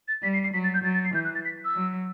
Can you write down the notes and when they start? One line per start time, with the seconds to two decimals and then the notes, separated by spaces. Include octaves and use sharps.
0.08 A6
0.23 G3 B6
0.34 C7
0.44 C7
0.53 F#3 B6
0.64 A6
0.74 G6
0.84 F#3 A6
0.94 A6
1.05 C7
1.14 E3 G6
1.25 F#6
1.35 A6
1.45 B6
1.65 E6
1.75 F#3